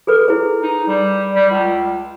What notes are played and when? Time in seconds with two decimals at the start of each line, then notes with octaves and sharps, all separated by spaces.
0.07 G#4 A4 B4
0.28 E4 G#4 C5
0.62 D#4
0.87 G3
1.33 G3
1.51 C#2